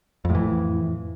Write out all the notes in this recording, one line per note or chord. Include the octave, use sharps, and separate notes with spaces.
F2 A2 E3